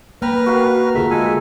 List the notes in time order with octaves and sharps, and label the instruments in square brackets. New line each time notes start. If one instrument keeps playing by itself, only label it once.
[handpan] A#3 [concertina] B4 F6 [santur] G5 A#5 B5
[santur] F#4 A#4 F5
[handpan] D3 F4 G#4 [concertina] A3 E5
[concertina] G#3 A4 G#5